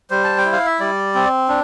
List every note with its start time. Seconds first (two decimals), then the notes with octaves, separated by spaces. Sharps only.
0.10 G3 C5
0.24 A5
0.38 G5
0.45 E4
0.53 F5
0.66 E5
0.79 G3 D5
1.15 C4
1.49 D4